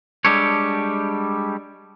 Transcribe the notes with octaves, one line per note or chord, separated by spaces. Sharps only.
G3 G#3 D4 G4 A4 C#5